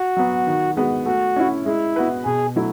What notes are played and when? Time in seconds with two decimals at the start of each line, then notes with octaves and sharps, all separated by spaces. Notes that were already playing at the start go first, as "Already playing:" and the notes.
Already playing: F#4
0.17 F#3 B3
0.47 D#3
0.76 G#3 B3 F#4
1.06 A3 F#4
1.36 C#4 E4
1.66 G#3 E4
1.96 B3 F#4 B4
2.26 B2 G#4
2.56 F#3 A3 E4